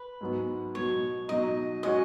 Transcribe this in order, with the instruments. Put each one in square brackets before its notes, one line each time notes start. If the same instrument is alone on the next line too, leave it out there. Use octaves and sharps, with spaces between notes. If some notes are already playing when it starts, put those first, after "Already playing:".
Already playing: [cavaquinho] B4
[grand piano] G#2 F#3 B3
[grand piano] B2 F#3 B3 [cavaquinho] C#5
[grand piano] B2 F#3 D#4 [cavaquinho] D#5
[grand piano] G#3 C#4 F#4 [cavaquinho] D#5